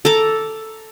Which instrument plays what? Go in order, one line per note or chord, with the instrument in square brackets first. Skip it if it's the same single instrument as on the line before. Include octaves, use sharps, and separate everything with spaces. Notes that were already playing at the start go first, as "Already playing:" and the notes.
[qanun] A4 A#5 D6